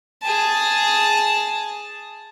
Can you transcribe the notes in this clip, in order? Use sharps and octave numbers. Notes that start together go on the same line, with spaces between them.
G#4 A5